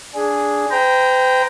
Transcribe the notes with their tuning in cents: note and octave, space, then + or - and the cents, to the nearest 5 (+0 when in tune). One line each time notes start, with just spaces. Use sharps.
D4 -10 G#4 +0
C5 -45 G5 +0 A#5 +5